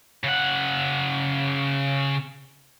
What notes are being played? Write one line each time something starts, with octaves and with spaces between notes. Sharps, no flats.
C#3 F#5